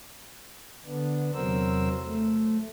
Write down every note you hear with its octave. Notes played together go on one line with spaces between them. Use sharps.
D3 B3 D4
E2 C3 F#3 A#4 C5 E6
A3